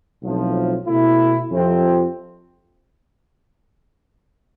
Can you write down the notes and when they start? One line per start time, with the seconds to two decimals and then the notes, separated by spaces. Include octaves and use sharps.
0.22 B1 A2 F3 C4
0.88 B2 A3 E4
1.52 F2 C3 F3 C4